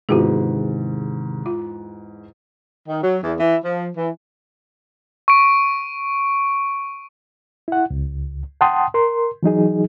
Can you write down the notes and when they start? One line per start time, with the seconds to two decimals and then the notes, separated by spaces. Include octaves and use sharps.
0.09 E2 G#2 C3 D#3 F4 F#4 G#4
1.46 F4
2.89 D#3
3.02 F#3
3.24 E2
3.40 E3
3.65 F3
3.96 E3
5.28 C#6 D7
7.68 E4 F#5
7.90 C#2
8.61 F#5 G5 A5 C6 D#6
8.94 A#4 C6
9.43 E3 F#3 D#4 G#4